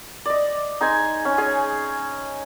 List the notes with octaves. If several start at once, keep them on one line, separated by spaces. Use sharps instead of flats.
D5 D#5
D#4 G#4 C5 G#5
C#4
G#4 C#5 G#5